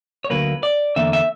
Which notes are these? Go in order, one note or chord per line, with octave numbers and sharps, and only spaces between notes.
C#5
D2 D3 F#3 A#3 B4
D5
E2 D3 A#3 E5
E5